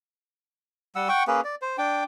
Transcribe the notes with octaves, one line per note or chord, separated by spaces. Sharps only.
G3 F#5 E6
F#5 G5 C#6
A#3 C#4 G#4 B4
D5
C5
D4 G5